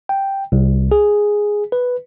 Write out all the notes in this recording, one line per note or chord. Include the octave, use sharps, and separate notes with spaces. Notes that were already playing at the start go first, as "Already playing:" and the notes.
G5
C2
G#4
B4